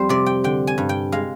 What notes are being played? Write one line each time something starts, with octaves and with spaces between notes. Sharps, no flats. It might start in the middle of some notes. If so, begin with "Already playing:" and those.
Already playing: F2 G3 C5
C3 D5
G5
D3 G5
G#5
G2
G5
G#3 F5